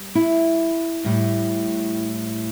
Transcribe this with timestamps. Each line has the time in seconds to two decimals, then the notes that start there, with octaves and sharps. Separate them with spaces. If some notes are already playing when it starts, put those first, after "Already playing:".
Already playing: G3
0.15 E4
1.05 A2 G3